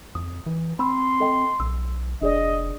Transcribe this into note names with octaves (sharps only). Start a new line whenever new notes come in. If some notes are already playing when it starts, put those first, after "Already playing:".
F2 D#6
E3
C4 B5 C6 E6
A4 D#5 G5
B1 E6
F1 D4 G#4 D5 D#5